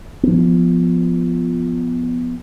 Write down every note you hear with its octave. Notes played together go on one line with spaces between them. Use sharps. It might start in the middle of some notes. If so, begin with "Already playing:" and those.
F3 B3